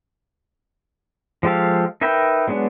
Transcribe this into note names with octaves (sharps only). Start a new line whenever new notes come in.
F3 G#3 G4 A4 F5
D#4 A#4 B4 E5 G5
F#3 G#3 B3 D4